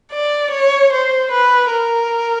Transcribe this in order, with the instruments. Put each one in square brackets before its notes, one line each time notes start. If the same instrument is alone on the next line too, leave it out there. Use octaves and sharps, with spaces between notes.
[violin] D5
C#5
C5
B4
A#4